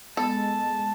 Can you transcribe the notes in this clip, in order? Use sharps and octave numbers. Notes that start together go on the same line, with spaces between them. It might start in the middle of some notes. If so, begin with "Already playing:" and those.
G#3 B3 A4 A5